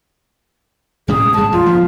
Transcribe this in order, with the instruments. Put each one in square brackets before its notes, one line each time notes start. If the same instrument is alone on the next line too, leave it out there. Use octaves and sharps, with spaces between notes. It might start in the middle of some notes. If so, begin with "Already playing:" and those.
[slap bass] A2 G3 C#4 [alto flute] G#4
[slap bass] G#2 G#3 [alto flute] A5
[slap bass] E2 [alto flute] F4
[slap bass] D2 F3 B3